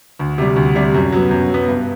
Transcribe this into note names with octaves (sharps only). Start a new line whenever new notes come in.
D2
C3 G3
D2
C3 G3
F#2
F#3 B3
F#2
F#3 B3
G2